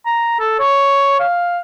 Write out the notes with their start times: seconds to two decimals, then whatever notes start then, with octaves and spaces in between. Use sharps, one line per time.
0.06 A#5
0.39 A4
0.60 C#5
1.20 F5